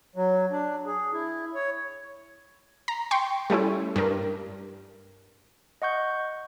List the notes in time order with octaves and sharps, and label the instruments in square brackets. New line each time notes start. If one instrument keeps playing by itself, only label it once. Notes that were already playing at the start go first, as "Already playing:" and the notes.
[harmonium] F#3
D4
G#4
E4
C#5
[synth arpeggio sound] A#5
G5 C6 C#6
G3 A3 C#4 E4
G2 A#4
[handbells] D#5 F#5 C#6 G6